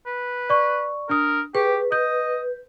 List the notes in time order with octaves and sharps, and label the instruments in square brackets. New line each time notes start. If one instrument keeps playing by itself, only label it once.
[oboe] B4
[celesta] D5 C#6
[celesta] D4 D#6 [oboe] A#4
[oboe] G4 [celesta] G#4 [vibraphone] B4
[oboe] D#5 [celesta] G6